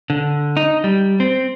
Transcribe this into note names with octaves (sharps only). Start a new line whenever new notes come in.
D3
D#4
G3
C4